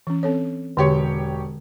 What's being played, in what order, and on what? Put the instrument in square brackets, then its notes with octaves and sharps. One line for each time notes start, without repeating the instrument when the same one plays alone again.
[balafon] E3 C#4
C4 A4 C#5
[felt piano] E1 G4 C#5 [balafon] D3